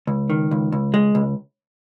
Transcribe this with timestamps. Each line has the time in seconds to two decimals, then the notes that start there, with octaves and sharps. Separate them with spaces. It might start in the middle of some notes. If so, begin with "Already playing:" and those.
0.07 C#2
0.30 D#3
0.51 C#2
0.72 C#2
0.94 G#3
1.15 C#2